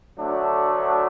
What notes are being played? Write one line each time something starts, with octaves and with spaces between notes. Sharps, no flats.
D2 D3 F#3 A3 D4